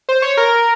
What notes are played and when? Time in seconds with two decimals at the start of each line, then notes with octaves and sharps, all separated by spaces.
0.09 C5
0.22 C#5
0.37 A#4